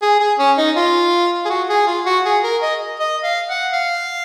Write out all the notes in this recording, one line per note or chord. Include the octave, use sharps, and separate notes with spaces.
G#4
G#4
C#4
D#4
F4
G#4
F#4
G#4
F4
F#4
G#4
A#4
D#5
D#5
F5
F#5
F5